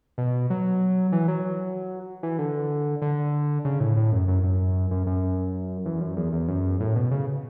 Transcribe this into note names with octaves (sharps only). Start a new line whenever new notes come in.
B2
F#3
E3
F#3
E3
D3
D3
C#3
A2
A2
F#2
F#2
F#2
F#2
F#2
E2
F#2
E2
E2
F#2
A2
B2
C#3